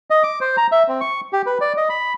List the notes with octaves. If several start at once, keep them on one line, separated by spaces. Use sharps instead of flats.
D#5
D6
C5
A#5
E5
C4
C#6
G4
B4
D5
D#5
B5